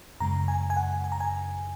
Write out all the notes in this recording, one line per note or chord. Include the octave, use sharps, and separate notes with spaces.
F#2 C#3 G#3 A#5
G#5
G#5
F#5
G#5
A#5
G#5